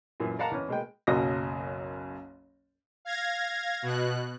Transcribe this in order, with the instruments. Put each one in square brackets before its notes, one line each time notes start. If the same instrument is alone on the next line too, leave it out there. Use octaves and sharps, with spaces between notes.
[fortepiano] F#2 A#2 E3
A#4 D5 F5 F#5 A5 A#5
E2 C#4
B2 G#3 A#3 G5
[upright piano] F#1 B1 F#2 F#4 D#6 A#6
[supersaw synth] F5 G#6 A#6
B2 F#6